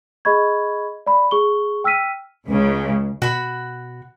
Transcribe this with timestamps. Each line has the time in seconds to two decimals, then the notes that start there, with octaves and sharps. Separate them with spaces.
0.25 G#4 D#5 B5 C#6 G#6
1.06 D5 B5
1.31 G#4 C#6 G7
1.84 G5 E6 F6 B6 D#7
2.48 C#2 C#3
3.22 B2 F#4 B5